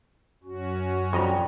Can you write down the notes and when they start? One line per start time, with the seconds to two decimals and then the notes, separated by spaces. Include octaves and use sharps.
0.44 F#2 C#4 F#4
1.13 F2 G3 D#5 A#5